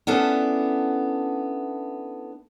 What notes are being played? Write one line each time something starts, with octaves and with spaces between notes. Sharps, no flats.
B3 C#4 D4 E4 A4